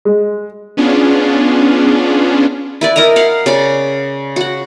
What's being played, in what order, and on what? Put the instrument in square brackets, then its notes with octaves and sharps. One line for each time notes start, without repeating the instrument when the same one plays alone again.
[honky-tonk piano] G#3
[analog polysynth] B3 C#4 D4 F4 G#4
[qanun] E4 B4 D5
E4 A#4 D#5 A#5
F5 F#5
C#3 D5 D6
F#4 F#5